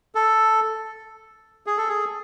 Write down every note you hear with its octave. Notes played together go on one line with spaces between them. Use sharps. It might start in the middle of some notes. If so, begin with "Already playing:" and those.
A4
G#4
A4
G#4